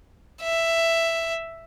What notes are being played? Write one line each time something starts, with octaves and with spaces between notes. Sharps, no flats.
E5